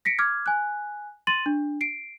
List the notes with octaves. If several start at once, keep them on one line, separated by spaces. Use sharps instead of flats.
A#6 B6 C#7 D7
D6 F6 G#6
G#5 F#6
C6 A6 D#7 F#7
D4
C7 D7